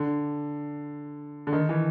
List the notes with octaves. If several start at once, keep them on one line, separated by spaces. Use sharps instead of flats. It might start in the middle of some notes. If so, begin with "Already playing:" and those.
Already playing: D3
D3
D#3
E3